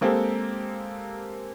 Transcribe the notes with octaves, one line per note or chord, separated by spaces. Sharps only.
G#3 A#3 C4 G4 A4